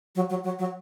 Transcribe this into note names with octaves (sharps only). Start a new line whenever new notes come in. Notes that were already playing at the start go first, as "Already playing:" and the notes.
F#3
F#3
F#3
F#3